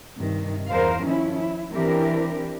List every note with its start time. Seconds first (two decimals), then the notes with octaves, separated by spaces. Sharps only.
0.18 G2 C3 D#3
0.69 E2 A#4 C5 F5
1.03 D#3 F3 C#4 E4
1.37 E4
1.72 E3 C4 D4 E4 G4 A#4